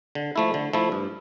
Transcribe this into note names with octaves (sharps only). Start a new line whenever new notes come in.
D3
F3 A3 E4
D3
F3 A3 E4
G2